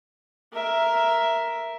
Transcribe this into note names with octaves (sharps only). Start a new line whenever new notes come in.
A#4 E5